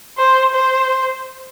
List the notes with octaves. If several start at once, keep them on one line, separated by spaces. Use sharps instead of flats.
C5
C5